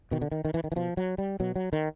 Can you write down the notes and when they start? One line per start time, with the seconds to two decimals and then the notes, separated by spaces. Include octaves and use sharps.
0.11 B2 D#3
0.22 D3
0.32 D#3
0.45 D#3
0.54 E3
0.64 D#3
0.72 E3
0.76 B2 F3
0.97 F#3
1.18 G3
1.40 B2 F#3
1.56 F#3
1.73 D#3